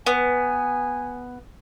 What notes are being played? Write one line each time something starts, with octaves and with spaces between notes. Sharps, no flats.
B3 G#5